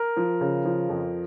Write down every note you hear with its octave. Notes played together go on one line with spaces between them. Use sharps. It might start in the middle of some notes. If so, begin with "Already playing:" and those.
Already playing: A#4
F3
C#3
F3
F2